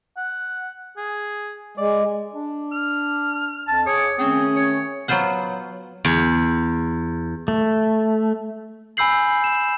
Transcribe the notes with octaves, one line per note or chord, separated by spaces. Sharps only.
F#5
G#4
G#3 D5
D4
F6
F2 A5
C#3 G#4 C#5 D6
D#3 A3 C4 C#4 G#4
C#5
F#3 B3 F4 C5 F#5
E2
A3
G#5 B5 E6 G6 C7 F#7
E7